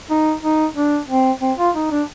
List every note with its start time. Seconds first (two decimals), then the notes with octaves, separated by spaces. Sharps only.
0.10 D#4
0.43 D#4
0.75 D4
1.09 C4
1.41 C4
1.58 F4
1.75 D#4
1.91 D4